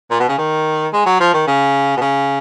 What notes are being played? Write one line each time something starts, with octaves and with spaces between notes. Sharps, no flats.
A#2
B2
C#3
D#3
G#3
F#3
F3
D#3
C#3
B2
C#3